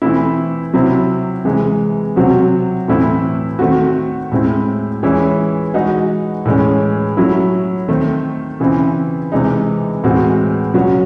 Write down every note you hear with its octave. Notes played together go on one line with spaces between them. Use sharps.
E3 A3 C4 E4
C3 F#3 C4 E4
C3 E3 G#3
C3 F#3 C4 F#4
A2 E3 A3 C4 E4
D#3 A3 C4 F#4
A2 G#3 C4 E4
E3 G#3 C#4 E4
E3 G#3 D#4 F#4
A2 E3 G#3 C#4
F#3 A3 C#4 E4
D#3 A3 C4
C#3 E3 C4 E4
C3 E3 G#3 D#4
A2 E3 G#3 C4 F#4
C#3 F#3 C#4 F#4